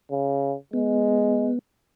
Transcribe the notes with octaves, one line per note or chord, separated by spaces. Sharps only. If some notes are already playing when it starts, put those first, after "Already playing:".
C#3
G#3 B3